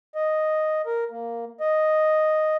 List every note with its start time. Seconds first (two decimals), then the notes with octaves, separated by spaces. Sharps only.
0.15 D#5
0.86 A#4
1.11 A#3
1.60 D#5